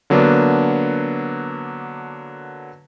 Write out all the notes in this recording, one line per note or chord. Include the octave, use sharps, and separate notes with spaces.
D3 F#3 A#3 B3 D4